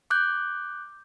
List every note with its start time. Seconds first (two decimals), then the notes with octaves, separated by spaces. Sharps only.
0.10 D6 F#6 G6